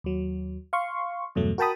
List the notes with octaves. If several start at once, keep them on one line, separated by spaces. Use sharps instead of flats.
D#2 F#3
F5 C6 C#6
E2 G2 B2 F#3 A3
F#4 A#4 G5 A5 B5 D#6